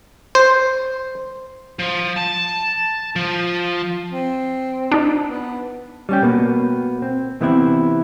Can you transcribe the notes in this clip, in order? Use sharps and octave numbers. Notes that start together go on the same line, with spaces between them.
C5
F3
A5
F3
C4
D4 D#4
B3
G3 C#4 G4
B2 A#3 B3
C4
C3 E3 B3 C4 E4